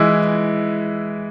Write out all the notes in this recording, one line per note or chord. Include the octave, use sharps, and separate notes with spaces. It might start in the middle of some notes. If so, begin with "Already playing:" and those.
Already playing: E3 G#3 E4